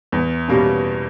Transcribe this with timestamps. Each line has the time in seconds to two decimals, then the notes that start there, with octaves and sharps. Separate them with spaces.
0.12 E2
0.48 B2 G3 A#3 C#4